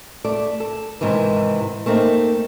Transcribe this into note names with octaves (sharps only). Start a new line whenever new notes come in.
A3 A4 D5
A4
G#2 C3 D#3 E3
A3 A#3 C4 D#4